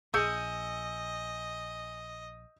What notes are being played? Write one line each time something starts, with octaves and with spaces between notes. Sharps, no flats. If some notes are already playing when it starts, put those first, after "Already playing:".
A#1 G#4 D#5 E6 G6 C#7